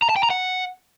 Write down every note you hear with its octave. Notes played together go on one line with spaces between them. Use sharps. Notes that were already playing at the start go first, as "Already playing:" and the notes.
A#5
A5
G5
A#5
F#5